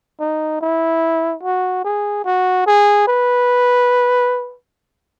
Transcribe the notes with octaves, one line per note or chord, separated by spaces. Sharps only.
D#4
E4
F#4
G#4
F#4
G#4
B4